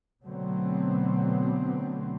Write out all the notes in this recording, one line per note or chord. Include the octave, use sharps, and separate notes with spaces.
B2 D3 F#3 A3 B3 C4